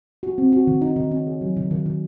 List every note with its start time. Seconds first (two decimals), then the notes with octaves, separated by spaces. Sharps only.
0.23 F#4
0.38 C4
0.52 F#4
0.67 D#3
0.81 D#4
0.96 D#3
1.11 C#4
1.27 G#4
1.41 F#3
1.57 D#3
1.71 D#3
1.86 D#3